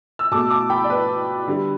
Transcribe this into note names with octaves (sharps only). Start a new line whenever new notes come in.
E6
B2 A3 A5 D6
A5 D6
G5 B5
D5
B4
D3 G3